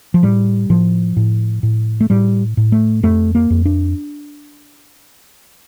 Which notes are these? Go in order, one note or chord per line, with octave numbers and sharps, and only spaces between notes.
F3
A2 G3
A2 F3
A2
A2
A3
A2 G3
A2
A3
F2 A3
A#3
F2
D4